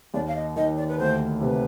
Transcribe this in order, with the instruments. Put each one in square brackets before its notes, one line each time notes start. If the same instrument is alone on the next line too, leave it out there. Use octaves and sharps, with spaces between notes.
[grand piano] D#2 [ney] D5
[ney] F5
D#5
[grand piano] D#3 [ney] D#5
[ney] D5
B4
[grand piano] D2 [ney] C5
[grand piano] C3 [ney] B4